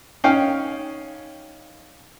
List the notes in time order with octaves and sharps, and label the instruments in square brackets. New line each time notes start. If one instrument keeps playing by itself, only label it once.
[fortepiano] C#4 D#4 C#5 F5 G5